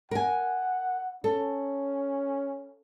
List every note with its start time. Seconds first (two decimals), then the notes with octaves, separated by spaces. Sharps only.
0.11 A#4 F#5 G#5
1.24 C#4 A4